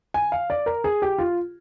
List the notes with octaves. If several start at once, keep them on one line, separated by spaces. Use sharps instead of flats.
G#5
F5
D5
A#4
G#4
G4
F4